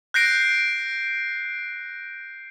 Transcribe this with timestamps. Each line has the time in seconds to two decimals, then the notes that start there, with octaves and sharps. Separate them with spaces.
0.14 F#6 G6 A#6 C7 D7